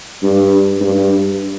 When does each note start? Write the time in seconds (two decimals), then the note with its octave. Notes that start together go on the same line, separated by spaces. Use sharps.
0.23 G2
0.81 G2